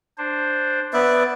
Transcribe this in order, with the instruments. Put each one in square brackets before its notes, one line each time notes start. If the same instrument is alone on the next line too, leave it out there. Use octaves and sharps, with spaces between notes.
[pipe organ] D4 C5
[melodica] B3 B4 E5 [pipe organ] D5